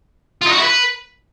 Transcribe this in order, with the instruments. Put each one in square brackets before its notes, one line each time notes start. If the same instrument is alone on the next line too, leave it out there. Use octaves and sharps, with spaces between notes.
[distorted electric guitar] F4
D#4
F#4
E4
B4